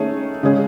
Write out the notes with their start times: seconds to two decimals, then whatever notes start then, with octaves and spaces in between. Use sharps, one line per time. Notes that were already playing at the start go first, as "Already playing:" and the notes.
Already playing: D#3 A3 C#4 G#4
0.43 C#3 G#3 C#4 G#4